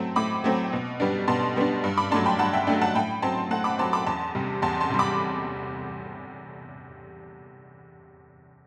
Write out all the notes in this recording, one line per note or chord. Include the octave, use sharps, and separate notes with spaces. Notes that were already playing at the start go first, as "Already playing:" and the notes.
Already playing: F#3 A3 C4 A5 C6
A2 B5 D6
F#3 A3 C4
B2
G3 B3 D4
B2 A5 C6
G3 B3 D4
G2
B5 D6
F#3 A3 D4 A5 C6
G5 B5
G2 F#5 A5
E5 G5
F#3 A3 D4 E5 G5
F#5 A5
A2 G5 B5
F#3 C4 A5 C6
A2 F#5 A5
B5 D6
F#3 C4 A5 C6
B5 D6
E2 A5 C6
C3 G3
E2 A5 C6
A5 C6
C3 G3
B5 D6